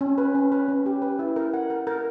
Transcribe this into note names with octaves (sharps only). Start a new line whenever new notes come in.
C#4
B4
C#4
B4
C#4
G4
B4
E4
A#4
F#5
A#4
A#4